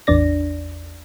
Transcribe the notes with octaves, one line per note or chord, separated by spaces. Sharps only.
A1 E2 D4 D5 A#6